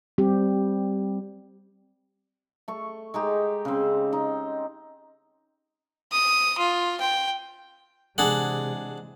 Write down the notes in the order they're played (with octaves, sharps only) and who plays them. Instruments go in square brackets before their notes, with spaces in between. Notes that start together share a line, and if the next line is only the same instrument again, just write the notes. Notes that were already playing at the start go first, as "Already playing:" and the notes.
[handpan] G3 C4 G4
[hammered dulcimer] A3 C#6
G#3 D#4 G4
C#3 C4
D#4
[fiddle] D#6
F4
G5
[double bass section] C3 E3 G#3 [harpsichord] D4 G#4 F#5